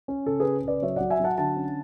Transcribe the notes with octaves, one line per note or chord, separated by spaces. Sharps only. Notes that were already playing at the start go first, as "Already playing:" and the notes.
C#4
C#3 A4
C#4 G#4 B4
C#3 B4 D5
F#3 C#5 E5
F#3 D5 F#5
E5 G#5
F#3 F#5 A5
D3 F#5 A5
C#4